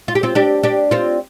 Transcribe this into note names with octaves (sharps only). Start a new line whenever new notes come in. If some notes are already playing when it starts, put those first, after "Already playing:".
F4
G4
C4 F4
D4 G4
D4 G4
C4 F4